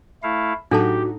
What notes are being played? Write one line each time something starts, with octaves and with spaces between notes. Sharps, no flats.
A3 E4 F5
A2 F#3 D4 D#4 F#4 G4 A4 A5